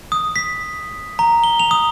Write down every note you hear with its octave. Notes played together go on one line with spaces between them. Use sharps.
D#6
B6
A#5
G7
F7
D#6